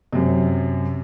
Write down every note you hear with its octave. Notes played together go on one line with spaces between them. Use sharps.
F#2 C3